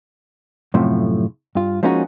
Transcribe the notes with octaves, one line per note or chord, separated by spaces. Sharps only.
F#2 A2 C3 F3 A3 C6
G2 F4
F3 G#3 A#3 C#4 D#4 F#4